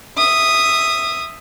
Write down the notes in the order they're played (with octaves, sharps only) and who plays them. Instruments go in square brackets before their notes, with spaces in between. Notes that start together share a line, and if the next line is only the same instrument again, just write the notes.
[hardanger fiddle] E5 D#6